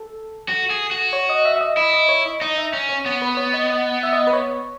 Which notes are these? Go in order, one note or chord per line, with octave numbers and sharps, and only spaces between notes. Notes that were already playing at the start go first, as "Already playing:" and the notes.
Already playing: A4
F#4
G#4
F#4
C#5
D#5
E5
E5
D#5
E4 D#5
D#5
C#5
D#5
D#4 D#5
E5
C#4
C#5
B3 C#5
B4
C#5
D#5
D#5
E5
D#5
B4
C#5